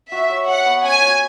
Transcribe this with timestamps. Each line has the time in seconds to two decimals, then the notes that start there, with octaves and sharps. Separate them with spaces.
0.12 F#4 E5
0.30 C#5
0.48 E5 F#5
0.65 B3
0.83 C#4 G#5
1.01 F#4